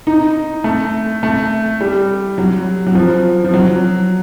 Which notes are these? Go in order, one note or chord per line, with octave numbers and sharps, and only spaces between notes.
D#4
A3
A3
G3
F#3
F#3
F3
F3
F#3